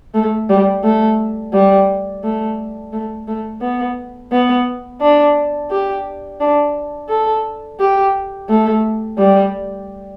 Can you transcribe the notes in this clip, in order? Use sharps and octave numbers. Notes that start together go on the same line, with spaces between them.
A3
G3
A3
G3
A3
A3
A3
B3
B3
D4
G4
D4
A4
G4
A3
G3